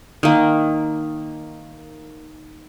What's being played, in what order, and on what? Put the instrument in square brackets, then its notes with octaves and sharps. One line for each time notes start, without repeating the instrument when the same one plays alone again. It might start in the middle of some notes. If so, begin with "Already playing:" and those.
[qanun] D#3 A#3